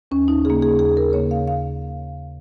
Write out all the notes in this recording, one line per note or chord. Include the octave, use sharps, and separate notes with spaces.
D#2 C#4
D#4
C#3 A#3 G#4
G#4
D#2 G#4
A#4
C#3 A#3 C#5
F5
F5